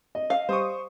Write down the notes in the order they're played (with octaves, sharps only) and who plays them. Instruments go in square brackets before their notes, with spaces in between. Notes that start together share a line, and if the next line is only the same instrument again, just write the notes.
[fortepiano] D#5
[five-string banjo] F5
[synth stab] G3 D#6 [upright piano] C5 C#6